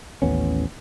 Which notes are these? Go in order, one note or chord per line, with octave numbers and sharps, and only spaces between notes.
A1 D#2 B3 C#4